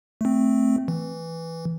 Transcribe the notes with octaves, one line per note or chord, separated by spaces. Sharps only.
A3 C4
E3